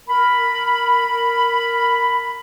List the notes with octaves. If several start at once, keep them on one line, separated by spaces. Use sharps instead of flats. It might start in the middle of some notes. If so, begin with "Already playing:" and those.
A#4 B5